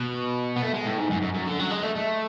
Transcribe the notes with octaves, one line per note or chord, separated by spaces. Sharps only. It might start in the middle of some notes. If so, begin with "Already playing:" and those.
Already playing: B2
B3
A3
G#3
A2
G#2
F#2
F#2
F#2
D3
F#3
G#3
A3
A3